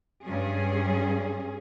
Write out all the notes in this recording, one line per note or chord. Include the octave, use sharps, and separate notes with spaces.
G2 C#4 G#4